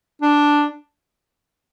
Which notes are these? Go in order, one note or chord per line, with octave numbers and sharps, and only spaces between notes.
D4